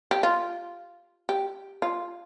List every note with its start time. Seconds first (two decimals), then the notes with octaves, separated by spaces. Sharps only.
0.11 G4
0.23 F4
1.29 G4
1.82 F4